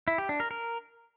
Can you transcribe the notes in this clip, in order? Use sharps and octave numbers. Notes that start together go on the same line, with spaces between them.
E4
G4
D4
A#4
A#4